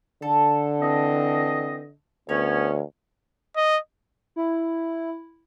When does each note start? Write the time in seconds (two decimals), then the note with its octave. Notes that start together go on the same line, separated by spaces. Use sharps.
0.22 D3 A4
0.81 E3 C4 D#5
2.29 D2 B3 C#4 C#5
3.56 D#5
4.36 E4